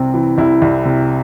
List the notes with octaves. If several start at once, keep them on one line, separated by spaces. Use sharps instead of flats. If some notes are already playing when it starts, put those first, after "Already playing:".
Already playing: C2 C3 C4
E3
C2 E4
C2
C3